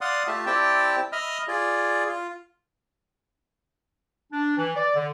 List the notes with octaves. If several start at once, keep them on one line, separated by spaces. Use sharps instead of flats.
D5 F5 F#5 C6 D#6
A3 F4 G4 E5 A5
C4 E4 G4 D5 G5 A5
D#5 E5 B5 D#6 F6
F4 G#4 D5
F4
D4
E3
D5
D3